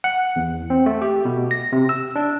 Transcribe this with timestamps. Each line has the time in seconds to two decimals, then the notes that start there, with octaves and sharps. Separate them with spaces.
0.04 F#5
0.36 E2
0.70 C4
0.86 A3
1.02 G4
1.25 B2
1.51 A#6
1.72 C3
1.89 E6
2.16 D4